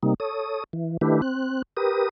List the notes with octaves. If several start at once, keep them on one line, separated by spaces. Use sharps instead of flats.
C3 G3 A#3 D#4
A4 C#5 D#6
E3
D#3 A3 D4 E4 G4 B4
C4 F#6
G4 A#4 B4 D#6